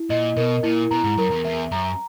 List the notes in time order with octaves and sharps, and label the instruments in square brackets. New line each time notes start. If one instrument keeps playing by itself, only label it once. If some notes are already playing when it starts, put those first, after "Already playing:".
Already playing: [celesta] E4
[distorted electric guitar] A#2 [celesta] D#5
[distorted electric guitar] B2 [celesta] A#4
[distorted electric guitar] A#2 [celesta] E4
[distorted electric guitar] B2 [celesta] A#5
[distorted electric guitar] G#2
[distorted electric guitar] F#2 [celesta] A#4
[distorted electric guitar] E2
[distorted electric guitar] E2 [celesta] E5
[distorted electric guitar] F#2 [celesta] A#5